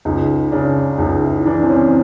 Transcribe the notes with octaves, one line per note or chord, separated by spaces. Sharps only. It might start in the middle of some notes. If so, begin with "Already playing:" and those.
C#2 D#4
C#3 D4
C#2 D#4
E4
E3 D4
C4
C#4